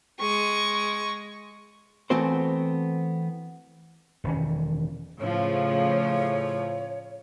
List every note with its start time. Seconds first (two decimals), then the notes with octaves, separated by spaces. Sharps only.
0.20 G#3 C#6
2.10 E3 A3 B3 C4 F#4 C5
4.24 E1 D#3 C#4
5.20 A2 C#3 F3 C#5